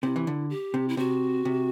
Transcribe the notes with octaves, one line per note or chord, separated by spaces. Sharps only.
C3 E4
E3
D3
G4
C3
E4
C3 F#4
C3